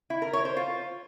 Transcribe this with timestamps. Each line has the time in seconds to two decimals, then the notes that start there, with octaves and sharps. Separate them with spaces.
0.10 E4
0.22 A#4
0.33 C#5
0.45 C5
0.57 F4